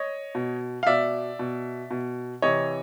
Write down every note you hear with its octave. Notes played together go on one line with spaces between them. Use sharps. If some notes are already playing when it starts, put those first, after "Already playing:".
Already playing: C#5 D#5
B2
F5
B2 D5 E5
B2
B2
C3 E3 C#5 D#5